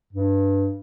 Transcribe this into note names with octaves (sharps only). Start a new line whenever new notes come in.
G2